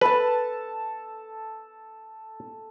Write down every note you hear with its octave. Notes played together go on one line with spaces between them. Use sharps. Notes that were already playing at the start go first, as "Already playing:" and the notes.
A4 B4 A5